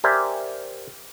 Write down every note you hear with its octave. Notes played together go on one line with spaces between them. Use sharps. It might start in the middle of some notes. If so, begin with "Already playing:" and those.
G4 A#4 C5 D5 E5 G#5